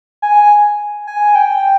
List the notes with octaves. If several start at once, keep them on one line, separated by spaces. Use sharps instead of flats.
G#5
G#5
G5